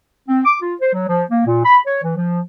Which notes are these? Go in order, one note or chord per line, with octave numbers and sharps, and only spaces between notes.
C4
D6
F4
C5
F#3
F3
A#3
A#2
B5
C#5
E3
F3